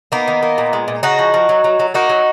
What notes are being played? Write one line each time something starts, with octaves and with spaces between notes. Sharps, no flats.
A#3 B3 D#4
D#3
A#3
A#2
G#3
A#2
C#3 D#4 F#4
F3
F3
F#3
F#3
F#3
A#3 D#4 F#4
F#3